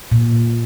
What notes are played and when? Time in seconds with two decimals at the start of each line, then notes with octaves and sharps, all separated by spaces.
0.12 A#2